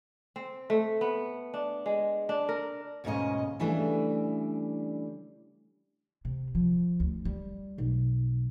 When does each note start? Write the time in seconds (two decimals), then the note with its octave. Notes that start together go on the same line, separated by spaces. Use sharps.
0.36 C4
0.70 A3
1.01 B3
1.54 D4
1.86 G#3
2.29 D4
2.49 A#4
3.04 D2 G#2 B2 A#3 C#4 D#5
3.59 C#3 E3 G3 A3 D4
6.25 C3
6.55 F3
7.00 D2
7.25 G3
7.78 B1